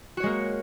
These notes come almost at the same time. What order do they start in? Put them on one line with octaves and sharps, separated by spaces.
F#4 C#5 G#3 A#3